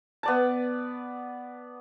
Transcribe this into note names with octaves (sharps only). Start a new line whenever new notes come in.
B3 D5 A5